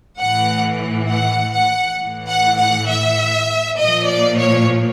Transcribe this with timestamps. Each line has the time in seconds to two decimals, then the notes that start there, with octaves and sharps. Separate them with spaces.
0.19 A2 E3 F#5
1.09 F#5
1.54 F#5
1.99 A2 E3
2.29 F#5
2.58 F#5
2.88 E5
3.78 A#2 F3 D#5
4.08 D5
4.37 C#5